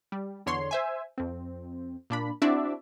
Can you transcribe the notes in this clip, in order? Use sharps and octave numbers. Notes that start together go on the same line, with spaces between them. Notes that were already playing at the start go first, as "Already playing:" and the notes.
G3
E2 D3 C#5 C6
C5 E5 G#5
F2 C4
A#2 D4 B5
C4 D4 E4 F#4 D5 E5